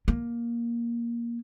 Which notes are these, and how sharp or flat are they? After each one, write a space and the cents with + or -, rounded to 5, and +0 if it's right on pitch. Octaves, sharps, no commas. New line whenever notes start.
A#3 +10